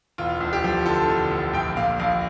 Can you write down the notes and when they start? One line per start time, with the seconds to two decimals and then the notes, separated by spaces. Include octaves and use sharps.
0.18 E1 F4
0.41 D2
0.53 G4
0.64 F3
0.86 D3 A4
1.09 E1
1.31 D2
1.54 A#1 G5
1.77 A#2 F5
2.00 A#1 F5